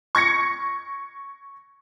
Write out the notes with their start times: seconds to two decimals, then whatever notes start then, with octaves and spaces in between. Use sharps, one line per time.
0.15 C#6 G#6 A#6 C#7